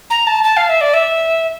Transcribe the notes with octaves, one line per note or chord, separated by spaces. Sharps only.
A#5
A5
A5
F5
E5
D5
E5